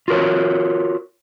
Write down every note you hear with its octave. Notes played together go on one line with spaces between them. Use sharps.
F4 F#4 A#4 C#5